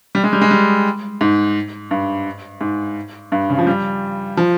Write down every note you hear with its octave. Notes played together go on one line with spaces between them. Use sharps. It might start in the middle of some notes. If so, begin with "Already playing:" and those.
G3
G#3
G3
G#3
G3
G#2
G2
G#2
G2
C#3
F3
G3
F3